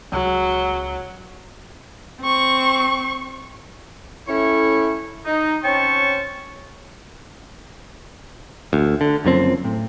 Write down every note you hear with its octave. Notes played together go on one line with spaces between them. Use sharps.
C#2 F#3
C4 C#6
A2 A3 C#4 E4 C#5 C#6
D#4
C4 C#4 C#5 G5 A5 C#6
D2
D3
F#1 F#2 F3 C4
A2